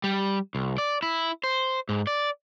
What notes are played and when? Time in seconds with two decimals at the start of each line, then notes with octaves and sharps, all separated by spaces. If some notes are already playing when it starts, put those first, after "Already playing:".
0.04 G3
0.55 C2
0.78 D5
1.02 E4
1.44 C5
1.89 G#2
2.07 D5